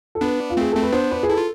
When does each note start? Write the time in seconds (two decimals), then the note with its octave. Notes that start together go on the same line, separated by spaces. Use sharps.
0.15 A4
0.21 B3 D4 B4
0.50 F4
0.57 A3 C4 G#4
0.72 A3 C4 A4
0.82 B4
0.92 B3 D4 C5
1.11 B4
1.23 G#4
1.29 E4 A4
1.37 F4